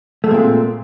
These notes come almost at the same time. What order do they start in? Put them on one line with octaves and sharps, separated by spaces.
A3 G#3 A#2 C4